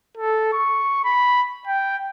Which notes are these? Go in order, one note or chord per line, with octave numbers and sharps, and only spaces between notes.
A4
C#6
B5
G5